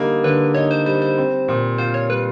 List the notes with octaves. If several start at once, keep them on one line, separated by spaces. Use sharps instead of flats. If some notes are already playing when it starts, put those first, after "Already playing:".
Already playing: D3 G3 A#3 D#4
D3 B4
D#4 C#5
C5
G3 C5
C5
C4
A#2
F4 C5
C#5
G3 B4